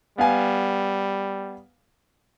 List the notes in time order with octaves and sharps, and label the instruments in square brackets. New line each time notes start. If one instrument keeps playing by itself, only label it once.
[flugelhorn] G3 [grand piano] B3 F5 G#5